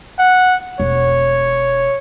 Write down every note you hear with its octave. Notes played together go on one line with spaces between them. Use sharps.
F#5
E1 C#5